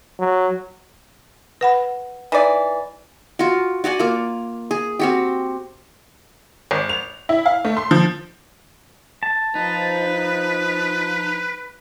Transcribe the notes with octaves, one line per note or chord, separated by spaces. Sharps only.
F#3
B4 F#5 B5
E3 D#4 D5
F4 F#4
F#4 D5 F#5 G#5
A#3 F4
G#4
C4 F#4 G4
G#1
F7
E4
F5
A3
C6
F3
A5
F3 D#4 B4